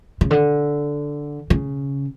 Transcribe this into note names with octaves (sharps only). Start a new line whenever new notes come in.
C#3
D3
C#3